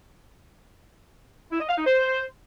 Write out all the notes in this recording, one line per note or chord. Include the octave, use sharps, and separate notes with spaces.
E4
D#5
F5
D#4
C5